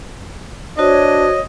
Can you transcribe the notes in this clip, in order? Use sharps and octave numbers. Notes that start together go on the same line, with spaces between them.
D4 F#4 C5 C#5 D#5